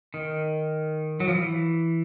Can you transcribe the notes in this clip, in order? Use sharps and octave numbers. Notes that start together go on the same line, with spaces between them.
D#3
F#3
F3
E3